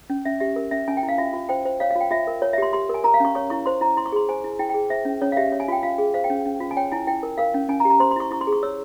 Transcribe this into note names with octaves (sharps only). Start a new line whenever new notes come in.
C#4
C#4 E5
G4 E5
A#4
C#4 E5
C#4 G#5
G5
E4
F5
F4 E5
F4
C5 G5
C5
C#5 F5
F5
F4 G5
F4 E5
A#4
C#5
E5
G4 C6
G4 C6
A#4 G#5
A#4 A#5
F5
C#4 C#6
C#5 C#6
E4 C#6
C5 C6
E4 A#5
E4 C6
C#6
G#4 C6
C5 G#5
E4
E4 G5
G5
G#4
C5 E5
C#4
C#4 C#5
F5
G4 E5
C#5
G#5
F4 G5
F4 F5
G#4
C5 F5
G5
C#4
C#4
F4
G#5
C#5 G5
E4 G#5
E4 G5
A#4
A#4 F5
C#4
C#4 G#5
A#5
G4
A#5
C5 C6
C6
E4 C#6
E4 C#6
C6
G#4
C#6
C#5 E6